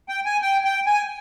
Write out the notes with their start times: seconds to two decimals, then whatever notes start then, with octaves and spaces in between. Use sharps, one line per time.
0.09 G5
0.25 G#5
0.42 G5
0.65 G5
0.87 G#5